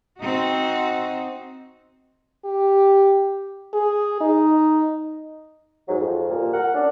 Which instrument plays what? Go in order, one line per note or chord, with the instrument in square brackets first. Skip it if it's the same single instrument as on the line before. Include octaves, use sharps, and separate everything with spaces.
[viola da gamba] C4 D#4 F#4
[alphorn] G4
G#4
D#4
[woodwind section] G#2 F#3
F2
D2 G2 A#2
A#4 F#5
C#4 D4